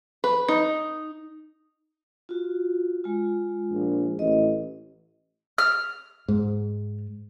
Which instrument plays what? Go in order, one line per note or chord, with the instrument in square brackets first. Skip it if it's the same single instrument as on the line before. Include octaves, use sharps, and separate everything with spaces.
[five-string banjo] B4
D#4
[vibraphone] F4 F#4
G#3 F4
[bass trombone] A#1
[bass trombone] A1 [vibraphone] D#5
[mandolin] F6
[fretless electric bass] G#2